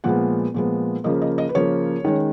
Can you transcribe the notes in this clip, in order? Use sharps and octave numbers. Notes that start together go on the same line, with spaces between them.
A#2 F3 G#3 B3 F#5
A#2 F3 G#3 B3
C#3 F3 A#3 D#5
D#5
D#5
B4
C#3 F3 A#3 C#5
D#3 G#3 C#4